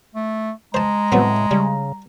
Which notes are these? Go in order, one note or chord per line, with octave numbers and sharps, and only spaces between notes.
A3
G#3 C5 A5 A#5
A2 F#3 B3 C4
C#3 G3